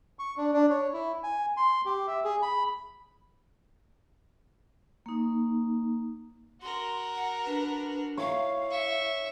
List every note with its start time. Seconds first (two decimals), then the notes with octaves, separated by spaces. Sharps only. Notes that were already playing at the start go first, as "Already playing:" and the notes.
0.19 C#6
0.37 D4
0.53 D4
0.70 C#5
0.93 E4
1.23 G#5
1.57 C6
1.86 G4
2.07 E5
2.24 G#4
2.42 B5
5.06 A#3 D#4
6.61 F#4 A#4 C6
7.15 F#5
7.46 D4 B4
8.17 E4 C#5 F5
8.71 E5 C#6